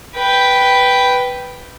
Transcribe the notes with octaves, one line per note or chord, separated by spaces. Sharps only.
B4 G5